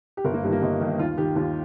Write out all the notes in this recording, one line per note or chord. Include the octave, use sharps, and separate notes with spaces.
G4
G1 A#4
A#3
G2 D#3 G3
A#3
G1 D#4
G2 D#3
D#2 F4
D#3 G4
D#2 F4